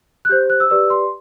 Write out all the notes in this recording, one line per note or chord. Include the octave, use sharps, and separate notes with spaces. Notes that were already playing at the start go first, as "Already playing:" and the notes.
F#6
G4 C5 G6
F#6
E6
G4 B4 D5 E6
C6